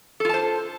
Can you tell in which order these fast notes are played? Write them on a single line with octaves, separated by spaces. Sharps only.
A4 F4 A5 C5